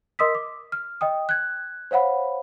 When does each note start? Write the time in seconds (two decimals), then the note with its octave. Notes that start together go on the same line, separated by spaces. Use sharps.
0.19 A#4 D#5 C6 D#6 E6 B6
0.35 D6
0.72 F6
1.01 D#5 G5 D#6
1.29 F#6 G#6
1.91 C5 C#5 F5 F#5 B5